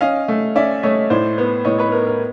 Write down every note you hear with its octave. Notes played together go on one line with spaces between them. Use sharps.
C#4 D#5 F5
A3
C#4 D5 E5
A3 C#5 D#5
A2 C5 D5
B3
A2 C#5 D#5
B4 C#5
B3 A#4
A#4